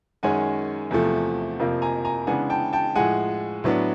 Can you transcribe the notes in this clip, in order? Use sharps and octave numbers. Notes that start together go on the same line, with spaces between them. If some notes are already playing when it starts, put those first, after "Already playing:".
F#2 D#3 G#3 C#4 F#5 G#5
E2 C3 F3 A3
F2 C3 F3 A#3
G#5 A#5
G#5 A#5
C#3 E3 G#3 B3 D4 F#5 G#5
G5 A5
G5 A5
A2 F3 G#3 F#5 G#5
A2 F#3 B3 D4